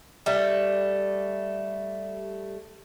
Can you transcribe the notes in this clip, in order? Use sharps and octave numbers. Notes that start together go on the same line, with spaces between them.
G3 A3